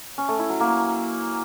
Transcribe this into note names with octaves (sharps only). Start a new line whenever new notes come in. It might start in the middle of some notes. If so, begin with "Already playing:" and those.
C#4
A3
E4
F#3
A#3